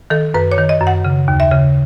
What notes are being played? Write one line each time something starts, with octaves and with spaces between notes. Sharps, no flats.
D#3 A4
F#2 B4
C#5
D#3
D#5
F#2
F#5
C#3
D#2
E5
C#3